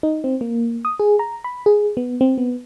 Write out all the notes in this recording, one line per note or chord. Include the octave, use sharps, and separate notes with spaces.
D#4
C4
A#3
D#6
G#4
A#5
B5
G#4
B3
C4
B3